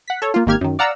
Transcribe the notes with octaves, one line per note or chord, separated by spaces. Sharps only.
F#5 B6
A4 C#5
A#3 F4
G#1 D#3 A#3 G4 F6 G#6
F#2 D#3
D5 F5 F#5 A#5 E6